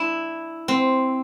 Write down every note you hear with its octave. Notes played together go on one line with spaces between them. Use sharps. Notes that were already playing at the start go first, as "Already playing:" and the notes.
Already playing: D4 E4
C4